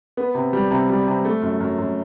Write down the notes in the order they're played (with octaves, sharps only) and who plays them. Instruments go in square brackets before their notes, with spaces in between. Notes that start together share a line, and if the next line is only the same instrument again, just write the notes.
[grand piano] B3
C3
G3
C3
G3
C3
A3
F#2
F#2
F#2